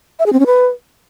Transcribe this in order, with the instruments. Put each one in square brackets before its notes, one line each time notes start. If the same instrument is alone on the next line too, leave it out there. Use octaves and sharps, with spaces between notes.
[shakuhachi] E5
G#4
C4
C#4
B4